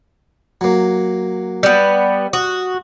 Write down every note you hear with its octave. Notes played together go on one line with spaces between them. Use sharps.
F#3 A#3
G3 B3
F#4 D#6